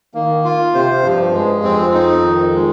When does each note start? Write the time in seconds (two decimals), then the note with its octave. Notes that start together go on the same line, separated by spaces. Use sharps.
0.14 D#3 A#3
0.45 F4
0.74 C3 C5
1.04 G2 F3
1.33 G2 G#3
1.64 F2 C4
1.94 D#4
2.24 D#3
2.54 G#3